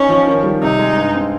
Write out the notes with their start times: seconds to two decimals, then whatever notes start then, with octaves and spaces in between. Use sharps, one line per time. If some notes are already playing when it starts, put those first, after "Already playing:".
Already playing: C#4 D#4
0.09 F3
0.27 D#3
0.44 G3
0.61 C3 D#4
0.79 G#3
0.97 G2
1.15 C4